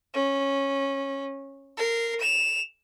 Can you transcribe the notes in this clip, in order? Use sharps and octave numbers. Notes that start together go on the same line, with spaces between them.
C#4
A#4 C7
E7 F7